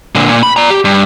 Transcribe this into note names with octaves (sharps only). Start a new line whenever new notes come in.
A#2 D3
A#2
B5
D5 A#5
G4
G2